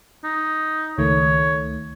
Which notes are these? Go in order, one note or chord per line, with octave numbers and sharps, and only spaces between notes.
D#4
C#2 D#3 A3 C#5